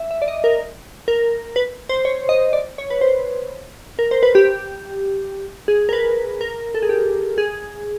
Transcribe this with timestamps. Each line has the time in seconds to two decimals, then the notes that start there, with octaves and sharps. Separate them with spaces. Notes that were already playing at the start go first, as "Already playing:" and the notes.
Already playing: E5
0.11 E5
0.22 D5
0.28 D#5
0.44 A#4
1.08 A#4
1.56 B4
1.89 C5
2.05 C#5
2.29 D#5
2.53 D5
2.78 C#5
2.90 B4
3.01 C5
3.99 A#4
4.11 C5
4.23 B4
4.35 G4
5.68 G#4
5.89 A#4
5.93 B4
6.41 A#4
6.74 A4
6.82 G#4
6.89 G4
7.38 G#4